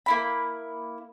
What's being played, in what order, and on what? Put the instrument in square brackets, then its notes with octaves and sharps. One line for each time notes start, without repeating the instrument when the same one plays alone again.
[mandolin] A#3 E4 B5